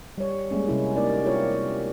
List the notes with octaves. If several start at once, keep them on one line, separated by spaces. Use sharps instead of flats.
G3 C#5
G3 G#3 A#3 C#4
C3 G3 C#4 E4
G3 G#3 A#3 D#4 A#4 D5
C4 E4 F4 G4 A#4 C#5